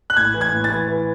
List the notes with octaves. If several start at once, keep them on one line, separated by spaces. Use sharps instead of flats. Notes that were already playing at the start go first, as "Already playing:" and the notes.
F#6
A2 G#6
E3
G#6
A2
A6
E3
E3